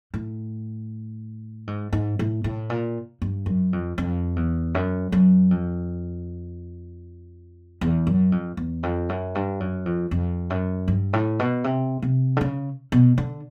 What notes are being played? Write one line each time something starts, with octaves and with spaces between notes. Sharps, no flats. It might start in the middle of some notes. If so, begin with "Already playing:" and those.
A2
G#2
G#2
A2
A2
A#2
G2
F#2
F2
F2
E2
F#2
F#2
F2
E2
F#2
F2
E2
F2
F#2
G2
F#2
F2
F2
F#2
G2
A2
B2
C3
C3
D3
C#3
B2
D3